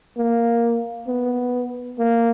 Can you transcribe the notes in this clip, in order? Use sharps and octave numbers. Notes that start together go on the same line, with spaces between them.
A#3
B3
A#3